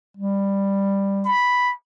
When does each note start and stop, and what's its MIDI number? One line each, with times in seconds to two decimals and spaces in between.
0.17 1.30 55
1.25 1.73 83